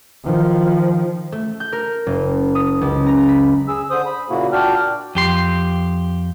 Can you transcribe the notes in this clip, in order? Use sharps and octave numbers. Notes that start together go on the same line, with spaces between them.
D#3 F3
A3
G6
A#4
F#1
D#6
C#2
A#5
B5
G#4 E6
D3 C5 D#6
B5
A#2 C#3 A#3 E4 F#4
A#2 D4 F#4 D5 G5 F6
F2 G4 C6